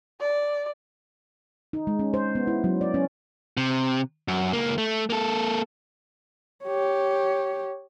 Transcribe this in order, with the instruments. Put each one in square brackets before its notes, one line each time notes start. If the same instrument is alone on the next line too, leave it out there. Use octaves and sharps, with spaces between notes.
[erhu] D5
[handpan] D#4
G#3
C#4
C5
B3
E4
F#3
D5
C#4
[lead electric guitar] C3
F#2
C#2 A#3
A3
A#3 A4
[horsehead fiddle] G4 C#5